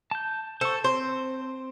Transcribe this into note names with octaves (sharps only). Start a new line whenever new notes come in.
A5 G6
A4 C5 C#6
C4 C5